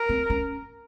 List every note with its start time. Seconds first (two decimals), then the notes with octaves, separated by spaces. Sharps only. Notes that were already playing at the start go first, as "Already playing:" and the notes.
Already playing: A#4
0.09 C4
0.30 C#4